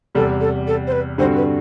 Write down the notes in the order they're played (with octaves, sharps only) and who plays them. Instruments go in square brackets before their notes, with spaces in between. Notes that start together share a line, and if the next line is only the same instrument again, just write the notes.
[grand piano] E2 C3 G3 [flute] A4
[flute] A4
A4
C5
B4
[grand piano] G2 D3 G3 C4 F#4 [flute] C5
[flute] B4